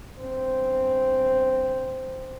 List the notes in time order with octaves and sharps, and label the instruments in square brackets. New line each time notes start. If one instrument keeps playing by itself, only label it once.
[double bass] G1 C4